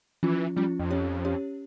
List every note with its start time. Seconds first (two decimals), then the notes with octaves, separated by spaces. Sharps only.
0.23 E3 F3 C#4 F4
0.56 F3 G3 C#4 F4
0.79 F2
0.90 C#4 G4 C#5
1.25 C#4 G4 C#5